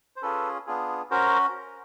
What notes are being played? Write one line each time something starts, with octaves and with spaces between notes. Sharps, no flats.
C5
C#4 F4 G#4 A4 B4
B3 D4 F4 G#4
C#4 F#4 A#4 C5